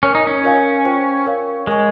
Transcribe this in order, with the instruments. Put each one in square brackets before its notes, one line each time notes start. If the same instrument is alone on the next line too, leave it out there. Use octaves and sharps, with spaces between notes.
[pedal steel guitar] C#4 [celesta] A#4 C#5 G#5
[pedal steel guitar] D#4
C#4
[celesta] F4 A#4 C#5 F5 G#5
F4 C5 G5 C#6
A#4 C#5 F5
[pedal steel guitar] G#3 [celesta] A#4 D#5 G#5 C#6